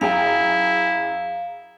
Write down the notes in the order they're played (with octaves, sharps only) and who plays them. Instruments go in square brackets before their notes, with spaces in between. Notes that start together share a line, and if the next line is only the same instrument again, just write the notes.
[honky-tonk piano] F#2 G#4 G5 [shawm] E4 [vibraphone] F5